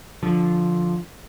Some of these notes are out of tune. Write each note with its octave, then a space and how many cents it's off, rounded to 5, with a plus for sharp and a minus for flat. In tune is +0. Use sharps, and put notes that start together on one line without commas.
D3 +0 F3 +0